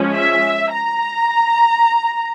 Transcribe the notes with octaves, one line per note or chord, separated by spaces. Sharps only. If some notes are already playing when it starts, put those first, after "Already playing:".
Already playing: F3 G#3 C#4
E5
A#5